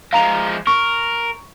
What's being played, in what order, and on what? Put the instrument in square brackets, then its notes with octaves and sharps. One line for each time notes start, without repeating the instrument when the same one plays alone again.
[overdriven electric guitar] F3 G#3 [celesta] F5 A#5 F7
[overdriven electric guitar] A#4 [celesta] C#6